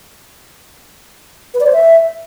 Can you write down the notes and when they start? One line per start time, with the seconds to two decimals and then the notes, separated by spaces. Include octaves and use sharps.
1.54 B4
1.60 D5
1.67 C5
1.73 E5